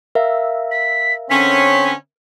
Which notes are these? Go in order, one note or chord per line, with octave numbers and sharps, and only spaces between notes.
A#4 E5 F5
B6
D3 C4 C#4 B6